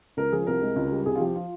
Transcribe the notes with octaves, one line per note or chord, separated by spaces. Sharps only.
C#2 A#4
F3 G#4
C2 A#4
G#3
C#2
G3
C2 G#4
F4
F3 G4
F4